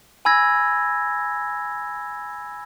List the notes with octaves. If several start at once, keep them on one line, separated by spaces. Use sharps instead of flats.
G#5 B5 E6 G#6 A#6